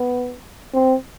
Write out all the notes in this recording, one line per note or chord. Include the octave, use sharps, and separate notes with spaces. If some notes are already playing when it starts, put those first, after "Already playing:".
Already playing: B3
C4